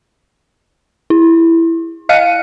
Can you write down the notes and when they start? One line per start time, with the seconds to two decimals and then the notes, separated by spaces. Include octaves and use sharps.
1.10 E4
2.09 D#5 F5 F6 F#6 C#7 D#7